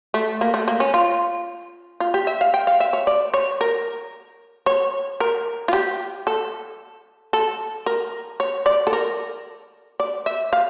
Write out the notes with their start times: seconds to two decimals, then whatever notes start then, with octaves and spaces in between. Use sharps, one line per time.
0.14 A3
0.41 A#3
0.54 A3
0.68 A#3
0.80 C#4
0.94 F4
2.00 F4
2.14 G4
2.27 E5
2.41 F5
2.54 G5
2.67 F5
2.80 E5
2.93 C#5
3.07 D5
3.34 C#5
3.61 A#4
4.66 C#5
5.20 A#4
5.68 F4
5.73 G4
6.27 A4
7.33 A4
7.86 A#4
8.40 C#5
8.66 D5
8.87 A4
8.93 A#4
10.00 D5
10.26 E5
10.53 F5